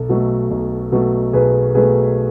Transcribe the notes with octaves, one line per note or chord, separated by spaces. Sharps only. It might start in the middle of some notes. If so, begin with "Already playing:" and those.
Already playing: B1 A4
B2 F#3 A3
B1
B2 F#3 A3
B1 G#4 B4
B2 F#3 A3 G#4 B4